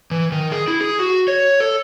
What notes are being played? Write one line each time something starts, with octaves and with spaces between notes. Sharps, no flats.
E3
D#3
G#4
E4
G#4
F#4
C#5
A4